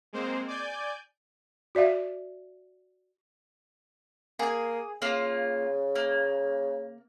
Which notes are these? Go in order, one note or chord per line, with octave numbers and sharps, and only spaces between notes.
G#3 A#3 C4 C5
D5 G#5 G6
F#4 D5 E5 F5
A#3 G#4 G#5
C#3 A#3 F4
A#3